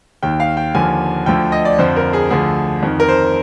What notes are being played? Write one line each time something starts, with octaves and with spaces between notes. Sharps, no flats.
D#2 D#3 G5
F5
G5
D#2 D3 F3 G#5
D2 D3 F3 G5
D#5
D5
F2 D3 F3 C5
A#4
G#4
D2 D3 F3 G#4
F2 D#3
A#4
C5